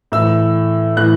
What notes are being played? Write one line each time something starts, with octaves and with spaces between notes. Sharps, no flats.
A2 E3 E6
A2 E3 F#6